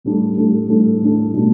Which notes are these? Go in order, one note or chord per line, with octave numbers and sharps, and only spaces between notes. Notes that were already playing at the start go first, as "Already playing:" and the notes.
A2 G3 D4 A4
A2 G3 D4 A4
A2 G3 D4 A4
A2 G3 D4 A4
B2 A3 D4